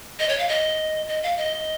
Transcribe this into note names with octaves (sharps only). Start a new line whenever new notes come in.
D#5
C#5
F5
D#5
D#5
F5
D#5